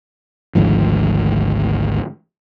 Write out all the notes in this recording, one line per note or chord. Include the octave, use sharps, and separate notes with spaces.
G#1 D2 G#2 F3